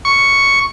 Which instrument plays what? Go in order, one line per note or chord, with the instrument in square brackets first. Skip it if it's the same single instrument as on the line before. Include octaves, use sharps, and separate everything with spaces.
[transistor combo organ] C#6